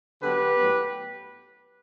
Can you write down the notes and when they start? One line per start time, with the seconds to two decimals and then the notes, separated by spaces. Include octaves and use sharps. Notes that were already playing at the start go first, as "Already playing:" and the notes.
0.22 D3 F#3 B3 D4 G4 B4
0.57 A2 F#3 B3